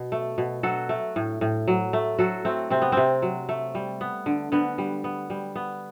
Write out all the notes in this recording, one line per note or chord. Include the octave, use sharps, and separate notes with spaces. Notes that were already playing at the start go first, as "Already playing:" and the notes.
Already playing: B2
A3
B2
F#3 F#4 A4
A3
A2
A2
F#3
A3
F#3 F#4 A4
A3 C4
C3 C4
B3
C3 C4
F#3
A3
G3
B3
D3
D3 B3
G3
B3
G3
B3